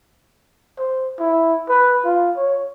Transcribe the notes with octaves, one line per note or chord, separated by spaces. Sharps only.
C5
E4
B4
F4
C#5